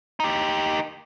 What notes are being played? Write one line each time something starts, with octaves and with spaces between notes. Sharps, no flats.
D#4 G4